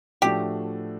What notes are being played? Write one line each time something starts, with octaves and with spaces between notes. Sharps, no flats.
A2 F3 A3 D4 F#4 G4